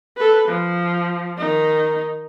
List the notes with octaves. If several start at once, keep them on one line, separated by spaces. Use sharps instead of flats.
A4 B4
F3
D#3 D#4